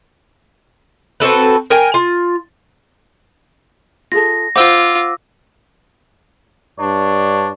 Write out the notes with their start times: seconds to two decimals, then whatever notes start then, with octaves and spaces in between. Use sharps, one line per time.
1.20 C4 F#4 A4 B4
1.70 A#4 G5 G#5
1.94 F4
4.12 F4 G#4 A4 A#6
4.56 F4 C5 F#5 D6 E6
6.80 G2 D4 C#5